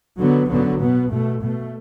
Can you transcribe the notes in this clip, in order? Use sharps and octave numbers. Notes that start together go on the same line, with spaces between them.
D3 F#3 B3
D3 F#3 B3
B2 B3
B2 A3
B2 A3